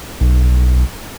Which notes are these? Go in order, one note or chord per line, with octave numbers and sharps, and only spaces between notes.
B1